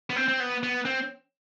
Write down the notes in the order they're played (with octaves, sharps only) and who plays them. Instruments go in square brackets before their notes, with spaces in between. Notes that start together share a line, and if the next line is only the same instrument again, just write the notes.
[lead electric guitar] B3
C4
C4
B3
B3
C4